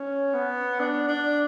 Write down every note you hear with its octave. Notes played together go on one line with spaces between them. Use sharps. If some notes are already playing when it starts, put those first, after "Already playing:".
Already playing: C#4
B3
D4
D4